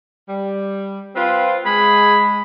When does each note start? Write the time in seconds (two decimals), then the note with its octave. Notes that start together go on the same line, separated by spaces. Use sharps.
0.28 G3
1.16 C4 F4 B4
1.66 G#3 G#4 B5